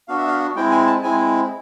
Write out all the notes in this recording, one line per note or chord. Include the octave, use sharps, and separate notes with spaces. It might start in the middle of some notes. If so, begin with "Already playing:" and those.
B3 D4 F#4 F5
E5
F5
G#3 C4 E4 G5
G#5
A5
G#3 C4 E4 G#5